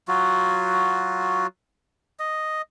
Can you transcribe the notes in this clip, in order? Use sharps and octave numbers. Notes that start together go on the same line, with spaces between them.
F#3 F4 F#4
D#5